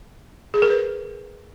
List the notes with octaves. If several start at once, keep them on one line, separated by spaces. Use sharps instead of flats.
G#4
A#4
B4